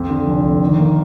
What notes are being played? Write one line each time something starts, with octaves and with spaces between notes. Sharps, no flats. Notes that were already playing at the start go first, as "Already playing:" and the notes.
Already playing: F2
D3
F1
F1
D#3
A#3